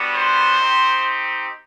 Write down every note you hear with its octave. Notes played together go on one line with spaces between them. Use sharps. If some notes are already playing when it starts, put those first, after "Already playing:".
Already playing: G3 B3 D4 F#4
C5
C4 D#4 G4